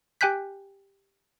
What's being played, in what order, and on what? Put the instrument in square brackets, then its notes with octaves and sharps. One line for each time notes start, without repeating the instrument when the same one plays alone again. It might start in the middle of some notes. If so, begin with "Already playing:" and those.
[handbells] G4 G5 G#5 F#6 G6 B6